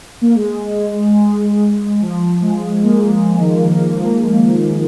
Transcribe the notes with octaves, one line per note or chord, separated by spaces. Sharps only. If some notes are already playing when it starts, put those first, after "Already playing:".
A#3
G#3
F3
G#3
A#3
G#3
D#3